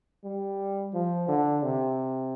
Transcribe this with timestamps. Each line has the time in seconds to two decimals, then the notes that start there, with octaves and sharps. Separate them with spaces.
0.24 G3
0.94 F3
1.28 D3
1.63 C3